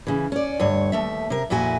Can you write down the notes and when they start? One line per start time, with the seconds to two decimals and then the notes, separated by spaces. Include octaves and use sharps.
0.07 C#3 E3
0.32 C#4 D5
0.60 D2 G2 C#5
0.92 D#2 A3 E5
1.30 C3 A#4
1.50 F2 A#2 E4 F#4 G#5